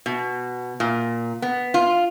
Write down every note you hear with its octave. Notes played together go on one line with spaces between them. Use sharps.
B2
A#2
B3
F4